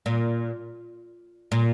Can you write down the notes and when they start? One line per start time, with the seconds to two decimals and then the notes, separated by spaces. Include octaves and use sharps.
0.06 A#2
1.52 A#2